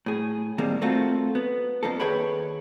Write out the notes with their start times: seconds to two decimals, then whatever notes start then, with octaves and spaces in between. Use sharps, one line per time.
0.06 A2 G#4
0.58 A2 D#3 G3 G#3 A#3 C4
0.81 A3 A#3 C4 F4 F#4 A4
1.35 B3
1.83 F2 F3 A#3 A4
2.00 D#2 G#4 B4 C#5 G5 B5